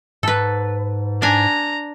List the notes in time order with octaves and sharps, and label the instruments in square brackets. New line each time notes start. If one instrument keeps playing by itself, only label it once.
[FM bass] G#2 [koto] A4 B4
[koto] D4 G#5 [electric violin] A#5